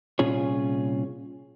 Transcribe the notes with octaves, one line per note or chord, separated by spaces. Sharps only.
C2 A#2 C#4 F4 G#4 C#5